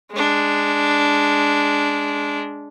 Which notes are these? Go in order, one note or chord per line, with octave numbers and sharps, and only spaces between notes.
G#3 D4